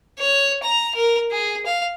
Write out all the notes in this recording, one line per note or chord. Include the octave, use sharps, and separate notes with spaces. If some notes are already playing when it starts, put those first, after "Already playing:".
C#5
A#5
A#4
G#4
F5